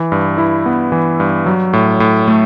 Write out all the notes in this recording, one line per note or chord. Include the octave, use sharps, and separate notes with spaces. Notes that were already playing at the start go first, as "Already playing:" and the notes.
Already playing: E3
G2
E4
B3
E3
G2
F#3
A2
A2
A3